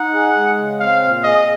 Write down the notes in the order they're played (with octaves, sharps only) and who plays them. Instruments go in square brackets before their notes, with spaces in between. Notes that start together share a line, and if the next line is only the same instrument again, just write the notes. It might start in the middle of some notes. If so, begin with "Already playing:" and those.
Already playing: [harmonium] D#4 [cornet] F#5
[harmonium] G#4
G#3
C#3
[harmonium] C4 [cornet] F5
[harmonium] A#2
[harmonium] G#4 [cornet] D#5